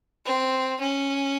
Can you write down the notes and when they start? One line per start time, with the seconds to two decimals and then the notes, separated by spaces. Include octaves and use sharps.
0.26 C4
0.81 C#4